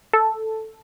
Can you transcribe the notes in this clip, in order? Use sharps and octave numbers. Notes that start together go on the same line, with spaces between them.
A4